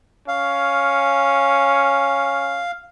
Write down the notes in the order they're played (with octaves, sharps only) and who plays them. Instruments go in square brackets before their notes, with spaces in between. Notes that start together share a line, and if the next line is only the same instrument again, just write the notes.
[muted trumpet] C#4 [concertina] F5